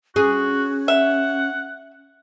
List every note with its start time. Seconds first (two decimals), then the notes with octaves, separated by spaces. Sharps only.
0.16 C#4 F#4 G#4
0.88 E5 F#5